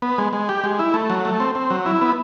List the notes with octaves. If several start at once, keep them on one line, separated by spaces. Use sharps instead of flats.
B3
G#3
G#3
G4
G#3
E4
A3
F#3
A3
C4
C4
F#3
E4
B3